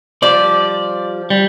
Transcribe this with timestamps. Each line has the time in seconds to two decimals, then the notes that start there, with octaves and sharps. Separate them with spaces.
0.23 F3 G3 D5
1.30 G3